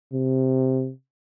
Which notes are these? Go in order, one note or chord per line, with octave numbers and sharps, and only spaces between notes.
C3